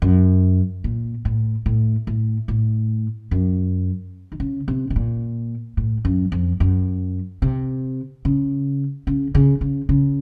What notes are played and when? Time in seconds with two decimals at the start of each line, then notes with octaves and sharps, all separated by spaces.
0.02 F#2
0.84 A#2
1.25 A2
1.66 A2
2.07 A2
2.48 A2
3.31 F#2
4.32 D#3
4.40 C#3
4.68 C3
4.90 C3
4.96 A#2
5.77 A2
6.05 F#2
6.32 F2
6.60 F#2
7.42 C3
8.25 C#3
9.07 C#3
9.35 C#3
9.61 C#3
9.89 C#3